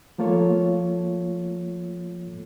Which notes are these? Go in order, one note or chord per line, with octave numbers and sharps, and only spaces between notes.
F3 A3 A#3 F4 A4 C#5